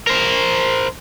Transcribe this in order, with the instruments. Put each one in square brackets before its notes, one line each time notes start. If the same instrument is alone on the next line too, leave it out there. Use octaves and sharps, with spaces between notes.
[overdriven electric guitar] A#4 C5